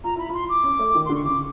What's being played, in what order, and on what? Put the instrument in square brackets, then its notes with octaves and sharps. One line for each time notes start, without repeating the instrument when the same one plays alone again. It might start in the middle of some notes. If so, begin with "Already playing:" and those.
[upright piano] F4 [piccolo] A#5
[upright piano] E4 [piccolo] B5
[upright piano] F4 [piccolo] C6
[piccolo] D6
[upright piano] C#4
A3
D#3
[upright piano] D3 [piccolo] C6
[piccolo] C#6
[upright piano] C#3 [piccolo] D6